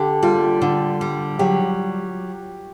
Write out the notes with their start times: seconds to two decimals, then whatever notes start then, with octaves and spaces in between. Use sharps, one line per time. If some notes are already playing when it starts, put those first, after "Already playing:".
Already playing: D3 G4
0.23 G3 F4
0.62 D3
1.01 G3
1.39 F#3 G4